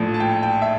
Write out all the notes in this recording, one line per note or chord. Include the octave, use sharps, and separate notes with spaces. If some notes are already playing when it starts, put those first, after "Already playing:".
Already playing: A#1 A2 F3
A5
G5
G5
E5